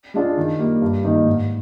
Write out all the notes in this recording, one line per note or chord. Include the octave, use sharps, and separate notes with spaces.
G#3 D4 F4 G#4
D#3
G3 A#3
G2
D#3 A#3 D#4
G#2